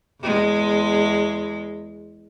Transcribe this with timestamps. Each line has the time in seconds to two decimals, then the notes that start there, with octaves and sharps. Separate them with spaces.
0.21 E2 G#3